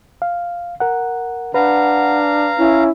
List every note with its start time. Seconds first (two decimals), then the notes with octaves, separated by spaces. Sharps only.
0.22 F5
0.80 A#4 F#5
1.54 D4 B4 F5 F#5 A#5
2.59 C#4 E4